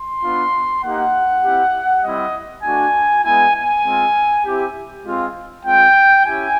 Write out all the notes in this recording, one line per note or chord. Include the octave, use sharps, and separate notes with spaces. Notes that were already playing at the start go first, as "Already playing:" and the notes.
Already playing: C6
B3 D4 F4
A#3 D#4 G4 F#5
C4 E4 G4
G3 C4 E4 D#5
A3 D4 F#4 G#5
G#3 B3 E4 G#5
G#5
G#3 C4 F4
C4 E4 G4
G#3 C4 F4
G#3 C4 F4 G5
C#4 E4 G4 G#5